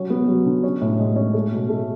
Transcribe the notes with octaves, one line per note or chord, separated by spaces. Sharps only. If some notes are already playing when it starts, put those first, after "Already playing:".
Already playing: F#3 C#4
B3
F#3
D3
C#4
A2
G#3
C#4
A3
B2
A3